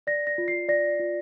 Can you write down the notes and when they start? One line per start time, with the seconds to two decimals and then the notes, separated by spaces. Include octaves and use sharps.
0.07 D5 A#6
0.27 A#6
0.38 F4
0.48 C7
0.68 D5 A#6
0.99 F4